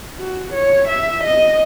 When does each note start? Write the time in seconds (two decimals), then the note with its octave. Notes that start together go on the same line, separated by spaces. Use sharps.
0.19 F#4
0.54 C#5
0.88 E5
1.24 D#5